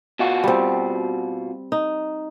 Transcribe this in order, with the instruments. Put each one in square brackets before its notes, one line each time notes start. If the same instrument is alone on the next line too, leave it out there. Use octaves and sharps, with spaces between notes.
[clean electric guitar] B2 F4 F#4
[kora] G3 C4
D#4